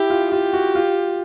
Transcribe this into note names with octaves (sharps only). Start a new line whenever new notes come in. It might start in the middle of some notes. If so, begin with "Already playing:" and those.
Already playing: E4 G4
F4
F4 G4
F#4
F4